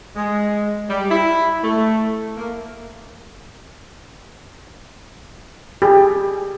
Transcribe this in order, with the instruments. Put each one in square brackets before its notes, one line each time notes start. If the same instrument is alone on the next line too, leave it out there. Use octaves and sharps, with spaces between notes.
[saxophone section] G#3
G3
E4
A3
A#3
[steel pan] G4 G#4